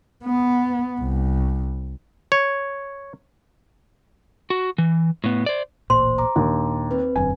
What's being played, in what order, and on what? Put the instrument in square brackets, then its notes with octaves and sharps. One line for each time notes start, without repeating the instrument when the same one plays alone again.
[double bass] B3
C2
[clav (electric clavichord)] C#5
[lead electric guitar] F#4
E3
A2 B3
C5 D5
[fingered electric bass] D1 A1 A#2 [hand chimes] C5 [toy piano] C6
[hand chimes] A#5 D6
[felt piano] D#2 [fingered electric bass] A#2 D4
[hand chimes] C4 B4
[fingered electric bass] E1 F#2 D3 [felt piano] G#5